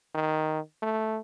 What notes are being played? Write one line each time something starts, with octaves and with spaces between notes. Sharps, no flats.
D#3
A3